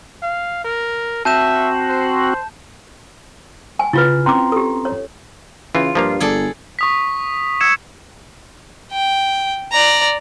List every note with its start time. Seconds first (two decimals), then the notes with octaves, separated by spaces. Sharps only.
0.22 F5
0.64 A#4
1.25 C4 F#4 E5 A5 G6 E7
1.89 C5
3.79 G#5
3.93 C#3 E4 F4 B4
4.26 C4 C#4 A#5 C6 D6
4.52 G4 A4
4.85 C#5
5.75 C#3 E3 F4
5.95 G2 F3 A#3 F5
6.20 G1 G#4 A4 D5
6.79 C#6 D#6 B6
7.61 E6 G#6 C#7 E7
8.92 G5
9.72 D5 A#5